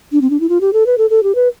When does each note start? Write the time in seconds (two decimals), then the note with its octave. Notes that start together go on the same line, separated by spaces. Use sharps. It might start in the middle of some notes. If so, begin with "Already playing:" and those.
0.12 D4
0.21 C4
0.30 D4
0.40 E4
0.49 F4
0.61 G4
0.73 A4
0.86 B4
0.98 A4
1.10 A4
1.23 G4
1.35 B4